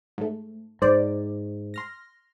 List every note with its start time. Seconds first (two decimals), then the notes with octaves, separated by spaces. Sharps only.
0.18 G#2 A3
0.82 G#2 C5 D5
1.74 C6 F6 A#6